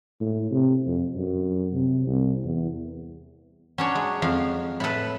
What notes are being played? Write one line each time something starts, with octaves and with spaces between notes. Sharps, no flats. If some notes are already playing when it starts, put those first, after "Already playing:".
A2
C3
F2
F#2
C3
C2
E2
F#3 C#4 D4 C#5
G#3
F2 F5
A2 A4 B4 B5